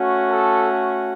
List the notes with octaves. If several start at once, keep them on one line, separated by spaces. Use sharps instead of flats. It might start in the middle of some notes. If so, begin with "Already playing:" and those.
Already playing: A3 C#4 F#4
A4